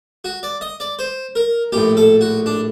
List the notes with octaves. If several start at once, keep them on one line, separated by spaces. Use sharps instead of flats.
F#4
D5
D#5
D5
C5
A#4
A#1 A2 G4
A4
F#4
D4